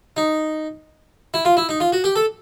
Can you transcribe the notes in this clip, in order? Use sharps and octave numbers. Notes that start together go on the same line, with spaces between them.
D#4
E4
F4
E4
D#4
F4
F#4
G4
A4